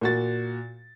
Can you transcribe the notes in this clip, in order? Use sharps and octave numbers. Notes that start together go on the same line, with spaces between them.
A#2 F#4 A6